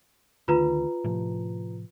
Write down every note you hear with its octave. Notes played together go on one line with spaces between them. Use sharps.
D2 D3 D#3 F4 B4 A#5
A2 C3 F3